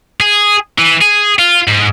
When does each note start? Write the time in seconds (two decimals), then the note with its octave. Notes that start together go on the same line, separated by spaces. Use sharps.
0.21 G#4
0.78 E3
1.02 G#4
1.39 F4
1.68 G#2